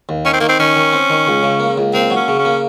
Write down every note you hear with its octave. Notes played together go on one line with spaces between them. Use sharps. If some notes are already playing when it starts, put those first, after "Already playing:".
D#2
D#3 C#4
C4
D#3 A#3
C4
D#3 C#4
D#3
C4
D#3
C#2
C#3
A#3
C#2
A#3 C4
F#3
C#4
C#3
C#4
A#3